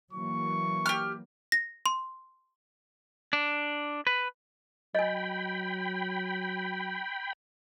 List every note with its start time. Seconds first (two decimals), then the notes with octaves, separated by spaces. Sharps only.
0.13 E3 F#3 A#3 C#6
0.86 G4 F6
1.52 A#6
1.86 C6
3.33 D4
4.07 B4
4.95 F#3 D#5 G5 G#5 B5